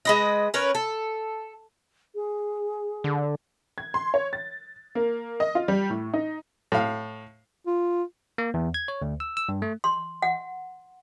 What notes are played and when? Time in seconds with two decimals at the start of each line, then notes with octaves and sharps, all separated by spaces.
0.05 G#3 B4 D#5
0.54 C#4 A#4 B4 C#5
0.75 A4
2.15 G#4
3.04 D3
3.78 G#6
3.94 C6
4.14 C#5
4.33 A6
4.95 A#3
5.40 D#5
5.55 F4
5.68 G3
5.90 A2
6.13 D#4
6.72 A2 F5
7.67 F4
8.38 A#3
8.54 E2
8.74 G#6
8.88 C#5
9.02 D2
9.20 E6
9.37 E6
9.49 G2
9.62 A3
9.84 C6
10.22 F#5